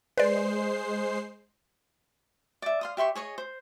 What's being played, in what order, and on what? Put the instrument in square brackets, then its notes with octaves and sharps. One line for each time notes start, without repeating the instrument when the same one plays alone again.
[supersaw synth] G#3 C5 C7 [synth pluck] B4 D5
[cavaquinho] D5 E5
F5 C6 D#6
G4 E5 C6 C#6
G#4 C#5 D#5 C#6
C5